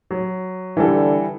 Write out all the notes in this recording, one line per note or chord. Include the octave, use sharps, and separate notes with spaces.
F#3
D3 E3 G3 A4